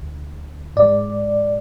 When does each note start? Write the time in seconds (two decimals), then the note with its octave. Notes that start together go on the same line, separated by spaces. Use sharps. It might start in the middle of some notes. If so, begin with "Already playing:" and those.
Already playing: D2 D3
0.76 G#2 G#3 D5